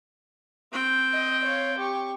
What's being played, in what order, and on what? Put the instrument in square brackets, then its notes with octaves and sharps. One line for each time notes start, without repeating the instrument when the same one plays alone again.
[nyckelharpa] C4 G5
[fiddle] D#5
C#5 F5
G4 C#6